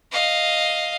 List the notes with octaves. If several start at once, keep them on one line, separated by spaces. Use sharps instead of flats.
D#5 F5